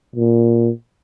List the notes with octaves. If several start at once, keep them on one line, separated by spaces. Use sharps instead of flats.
A#2